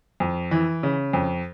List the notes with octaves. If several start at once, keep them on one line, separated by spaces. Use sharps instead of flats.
F2
E3
C#3
F2